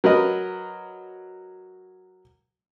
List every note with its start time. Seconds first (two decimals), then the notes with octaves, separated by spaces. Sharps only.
0.04 F#3 A#4 B4 D#5